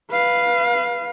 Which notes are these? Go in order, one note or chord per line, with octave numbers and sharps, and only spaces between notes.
B4 F5